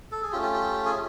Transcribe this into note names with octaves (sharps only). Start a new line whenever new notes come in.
A4
G#4
A3 C#4 F4 G4
G4
G4
G#4